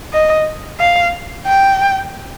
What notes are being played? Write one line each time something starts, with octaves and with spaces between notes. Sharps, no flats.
D#5
F5
G5